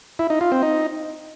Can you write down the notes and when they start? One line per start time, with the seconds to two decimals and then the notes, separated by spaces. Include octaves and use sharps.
0.19 E4
0.30 D#4
0.41 F4
0.52 C4
0.63 D#4